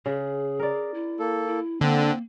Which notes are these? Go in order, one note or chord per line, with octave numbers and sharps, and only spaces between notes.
C#3 G#4
A#4 D5
E4
A#3 A4
E4
D3 A#3 C4